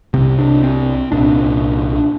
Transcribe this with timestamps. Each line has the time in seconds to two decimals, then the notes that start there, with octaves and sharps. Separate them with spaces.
0.14 C2 C3 C4
0.39 D4
0.63 C4
1.12 C2 A#2 D4